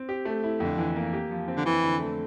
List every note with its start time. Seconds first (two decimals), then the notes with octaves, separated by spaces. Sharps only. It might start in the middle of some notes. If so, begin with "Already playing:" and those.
Already playing: C4
0.09 G4
0.25 A3
0.44 E4
0.60 F2 D3
0.78 E3
0.96 A#3
1.13 G4
1.31 F3
1.48 C4
1.56 D3
1.65 F2 E3
1.83 D3
2.00 A3